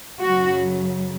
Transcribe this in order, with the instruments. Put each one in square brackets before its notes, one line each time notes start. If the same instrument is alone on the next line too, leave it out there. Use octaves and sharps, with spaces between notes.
[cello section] F#2 C#3 F#3 F#4